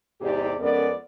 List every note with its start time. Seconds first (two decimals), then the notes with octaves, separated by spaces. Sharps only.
0.21 E2 G#2 C3 G4 G#4 D5
0.60 F2 G#3 B3 C#4 A#4 D5